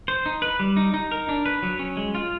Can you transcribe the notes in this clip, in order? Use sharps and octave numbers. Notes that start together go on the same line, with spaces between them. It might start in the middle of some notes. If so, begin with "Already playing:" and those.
C5
D#4
B4
G3
D#4
D#4
A#4
D4
B4
F#3
C#4
G#3
F4